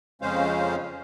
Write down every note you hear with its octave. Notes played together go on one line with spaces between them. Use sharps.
F2 C#3 G#3 C#4 C5 F5